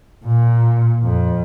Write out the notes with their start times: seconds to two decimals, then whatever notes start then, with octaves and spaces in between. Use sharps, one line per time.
0.25 A#2
1.03 F2